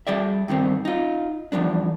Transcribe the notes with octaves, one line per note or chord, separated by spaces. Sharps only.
G3 G#4 D5 E5
G2 D#3 G3 C4
D#4 F4
E2 F3 G3 D4